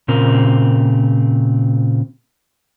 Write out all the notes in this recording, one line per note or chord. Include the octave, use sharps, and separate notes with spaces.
A#2 C#3 C4 A#4